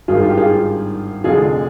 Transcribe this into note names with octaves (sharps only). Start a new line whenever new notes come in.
G#1 G2 D#3 F4 G#4
F4
G4
F4 G#4
F1 F2 D3 F4 G#4